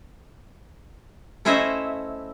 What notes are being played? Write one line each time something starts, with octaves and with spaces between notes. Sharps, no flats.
A3 C#4 E4 C5 D#5 E5